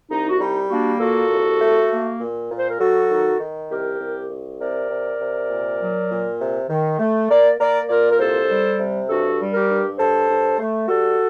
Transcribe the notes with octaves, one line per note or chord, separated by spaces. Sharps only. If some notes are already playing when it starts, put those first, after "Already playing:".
C2 D#4
F#4
G3 D#4
A#3 D4 F#4
A#2 F#4 A4
C2
A3
A#3
A#2
A#2
C5
A#4
F#3 F#4 A4
D#3
D#3
C2 G4 A#4
C2
C2
C3 A#4 D5
C3
C3
A#2
F#3
A#2
C3
D#3
A3
A#3 A#4 D5
A#3 A#4 D5
A#2 A#4 D5
A#4
C2 A4 C5
G3
C3
G2 F#4 A4
G3
G4 A#4
G2
G2 A4 C5
G2
A3
G3 F#4 A4